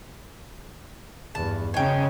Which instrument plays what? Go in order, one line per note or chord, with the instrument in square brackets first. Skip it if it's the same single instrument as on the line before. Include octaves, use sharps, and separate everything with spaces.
[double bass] E2 G2 [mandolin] A5
[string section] C#3 C#5 [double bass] D#4 [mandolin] G5 G#5